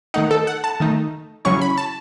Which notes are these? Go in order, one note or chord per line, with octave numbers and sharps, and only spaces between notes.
D#3 A3 D#4 F#5
A4
F#5
A5
D#3 A3 D#4
C#3 F#3 C#4 E4 C#6
B5
A5